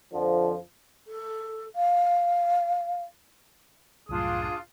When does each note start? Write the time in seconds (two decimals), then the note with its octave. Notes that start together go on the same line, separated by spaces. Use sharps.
0.14 F2 D3 F3
1.07 A4
1.75 F5
4.09 C2 F#2 A2 D4 F4 G#4 D#6